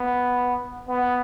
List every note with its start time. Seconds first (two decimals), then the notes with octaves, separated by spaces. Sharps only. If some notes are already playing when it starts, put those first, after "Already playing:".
Already playing: B3
0.88 B3